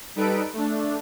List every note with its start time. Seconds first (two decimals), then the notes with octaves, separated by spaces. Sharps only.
0.16 G3 D#4 A4 B4 D7
0.53 A3 D4